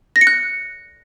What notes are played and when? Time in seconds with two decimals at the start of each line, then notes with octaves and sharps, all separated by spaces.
0.16 A#6
0.21 C#7
0.27 F#6